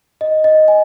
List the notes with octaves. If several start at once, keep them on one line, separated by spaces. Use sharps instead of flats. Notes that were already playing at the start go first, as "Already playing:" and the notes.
D#5
D#5
G#5